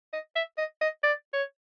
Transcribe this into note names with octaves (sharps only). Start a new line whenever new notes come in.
D#5
E5
D#5
D#5
D5
C#5